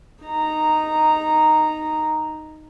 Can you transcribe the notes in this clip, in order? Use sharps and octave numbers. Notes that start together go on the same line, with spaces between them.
D#4 A#5